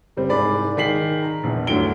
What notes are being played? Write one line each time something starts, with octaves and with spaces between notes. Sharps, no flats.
F#1 G3 C4
C2 G#2 G#4 D5 B5
D#3 G#4 B6 C7 F#7
A#5
A#1 E2
G1 D2 F#3 D7 G7